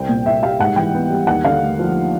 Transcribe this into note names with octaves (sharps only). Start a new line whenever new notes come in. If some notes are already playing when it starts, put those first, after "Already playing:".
Already playing: C2 C4 G5
A#2
C2 E5
G3 F5
G#2 F#5
E3 G5
B3
G3
D#2 F#5
D3 F5
A3
F3